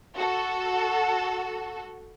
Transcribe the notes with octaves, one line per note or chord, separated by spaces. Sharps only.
F#4 A4